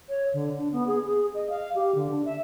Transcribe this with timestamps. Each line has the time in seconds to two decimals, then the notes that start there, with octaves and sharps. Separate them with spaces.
0.09 C#5
0.34 D3
0.58 D4
0.72 B3
0.87 G#4
1.07 G#4
1.35 D#5
1.50 F5
1.75 G4
1.95 D3
2.10 D4
2.25 E5